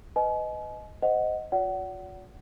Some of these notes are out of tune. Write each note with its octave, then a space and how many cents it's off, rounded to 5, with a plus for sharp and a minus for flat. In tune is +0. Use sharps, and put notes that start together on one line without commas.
B4 +25 D#5 +0 G#5 +40
C5 -20 D#5 +0 F#5 +0
F4 +45 D5 -45 F#5 +25